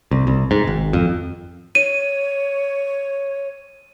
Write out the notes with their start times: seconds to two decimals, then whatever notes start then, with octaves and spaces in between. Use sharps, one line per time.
0.11 C2
0.27 C2
0.51 G#2
0.67 G#1
0.93 F2
1.75 C#5 D#7